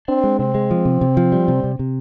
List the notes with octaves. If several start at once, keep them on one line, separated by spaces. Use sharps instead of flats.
C4 D4
G#3
C3 C4
G#3
F3
C3
C3
F3
G3
C3
C3
C3